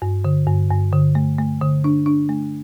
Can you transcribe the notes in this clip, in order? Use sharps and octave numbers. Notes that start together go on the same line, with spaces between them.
G2
D3
G2
G2
D3
A3
A3
D3
D4
D4
A3